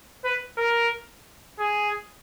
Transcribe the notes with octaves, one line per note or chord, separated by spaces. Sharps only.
B4
A#4
G#4